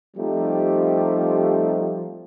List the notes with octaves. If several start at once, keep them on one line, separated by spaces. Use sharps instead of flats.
F3 G3 A3 C4 D#4 G4